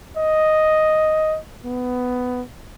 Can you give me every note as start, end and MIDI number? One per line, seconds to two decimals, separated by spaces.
0.17 1.38 75
1.65 2.42 59